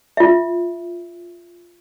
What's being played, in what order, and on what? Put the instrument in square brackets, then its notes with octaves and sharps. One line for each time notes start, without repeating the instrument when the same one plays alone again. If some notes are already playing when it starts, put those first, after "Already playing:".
[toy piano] F4 E5